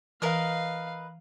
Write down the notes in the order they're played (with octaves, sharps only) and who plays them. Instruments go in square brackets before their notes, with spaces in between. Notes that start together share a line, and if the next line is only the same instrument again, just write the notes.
[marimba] E3 [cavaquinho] A#4 B4 D#5 [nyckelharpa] F5